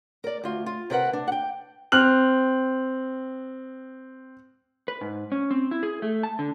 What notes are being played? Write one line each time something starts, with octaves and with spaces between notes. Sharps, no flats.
A#4 D5
D2 F4
F4
C3 A#4 B4 F#5
D4
F#5 G5
C4 F6 F#6 F#7
B4
G#2
C#4
C4
E4
G#4
A3
A5
D3